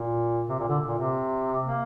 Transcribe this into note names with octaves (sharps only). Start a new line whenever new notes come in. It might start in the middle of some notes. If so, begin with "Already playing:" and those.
Already playing: A#2
C3
A#2
D3
A#2
C3
A#3